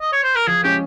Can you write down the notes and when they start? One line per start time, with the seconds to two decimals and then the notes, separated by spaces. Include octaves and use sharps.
0.01 D#5
0.13 C#5
0.24 C5
0.35 A#4
0.47 F3 G#4
0.63 G#3 C#4 G4 G#4